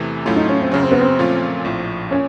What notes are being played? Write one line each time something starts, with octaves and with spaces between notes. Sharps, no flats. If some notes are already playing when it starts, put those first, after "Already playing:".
Already playing: E2 C3 E3 A3
A2 F#3 A3 C#4 E4 F4
D#4
C#4
C4
F#2 C#3 F#3 C#4
C4
B3
C4
A#2 F3 A3 C#4 F4
A#1 A2 F3
A#2 C#4